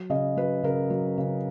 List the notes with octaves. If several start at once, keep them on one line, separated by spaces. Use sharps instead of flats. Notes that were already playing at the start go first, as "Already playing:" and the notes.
Already playing: F#3
C#3 D#5
F#3 B4
C#3 A#4
F#3
C#3